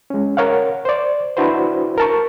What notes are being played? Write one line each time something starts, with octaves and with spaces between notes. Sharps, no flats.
G#3 C#4
A#4 C#5 F5 F#5
C5 D5
D4 E4 F#4 B4 C5
A#4 A5 C#6